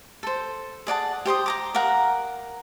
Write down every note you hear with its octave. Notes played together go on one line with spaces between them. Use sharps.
A4 C5
G#4 D5 F#5 A5
G4 C5 C6 D#6
G4 A#5 D6
A#4 F5 F#5 A#5